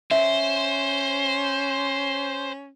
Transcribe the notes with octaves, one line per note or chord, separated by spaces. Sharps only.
C#4 C5 E5